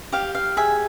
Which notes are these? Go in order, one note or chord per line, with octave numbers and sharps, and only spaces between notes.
G4 F5
F5
G#4 E5